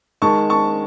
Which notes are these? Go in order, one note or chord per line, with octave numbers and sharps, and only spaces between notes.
D#3 G#3 A5 C#6
A5 C#6